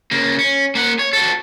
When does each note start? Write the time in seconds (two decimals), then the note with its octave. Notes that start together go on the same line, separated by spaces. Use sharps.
0.11 C#3 A#3
0.39 C#4
0.75 A#3 F#5
0.99 C#5
1.13 F#4 A4